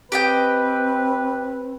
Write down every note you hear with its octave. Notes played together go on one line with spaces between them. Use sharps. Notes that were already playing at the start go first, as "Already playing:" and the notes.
C4 G4 B4 D#5 G5